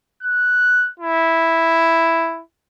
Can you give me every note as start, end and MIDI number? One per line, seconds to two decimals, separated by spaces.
0.23 0.89 90
1.00 2.41 64